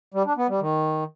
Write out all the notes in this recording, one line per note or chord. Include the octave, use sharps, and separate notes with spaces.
G3
D4
B3
G3
D#3